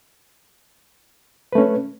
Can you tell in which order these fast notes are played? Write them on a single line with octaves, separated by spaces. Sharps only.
B4 A3 C#4